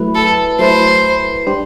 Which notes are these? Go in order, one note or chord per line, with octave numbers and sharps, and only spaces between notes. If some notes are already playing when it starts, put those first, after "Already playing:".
Already playing: F#3 A3 E4 B4
A4
F#3 A3 E4 B4 C5
G3 D4 G4 C5